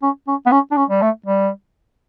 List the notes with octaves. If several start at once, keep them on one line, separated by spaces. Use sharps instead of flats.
C#4
C#4
B3
C#4
D4
C#4
G3
A3
G3